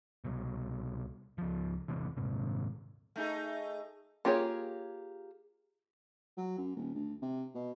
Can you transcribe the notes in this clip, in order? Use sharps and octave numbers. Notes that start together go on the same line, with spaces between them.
C2 B2
C#2 F3
A1 E2 C3 E3
D#1 G#2 C3
A3 D#4 G#4
A#3 F4 G4 G#4 C#5
F#3
F#2
D#1
D2
C3
B2